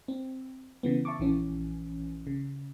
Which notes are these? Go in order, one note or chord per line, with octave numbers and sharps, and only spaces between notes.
C4
C#3 E3 B3
E5 A5 C#6 D6
A#1 E3 C#4
C#3